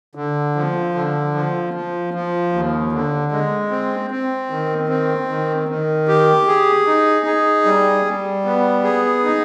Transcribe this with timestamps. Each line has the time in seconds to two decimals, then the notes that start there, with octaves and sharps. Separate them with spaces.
0.15 D3
0.56 F3
0.94 D3
1.34 F3
1.73 F3
2.14 F3
2.52 D#2
2.92 D3
3.32 G#3
3.71 C4
4.11 C4
4.50 D#3
4.89 C4
5.29 D#3
5.69 D#3
6.08 G4
6.47 G#4
6.87 D#4
7.26 G#4
7.65 G3
8.05 G3
8.45 B3
8.84 G#4
9.24 D#4